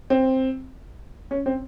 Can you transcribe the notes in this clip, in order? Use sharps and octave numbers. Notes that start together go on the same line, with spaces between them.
C4
C#4
C4